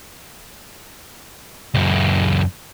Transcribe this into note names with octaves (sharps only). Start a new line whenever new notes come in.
C#2 F#2